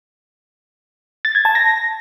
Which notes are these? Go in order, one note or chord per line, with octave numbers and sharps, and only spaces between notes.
A6
G#6
A5
A#6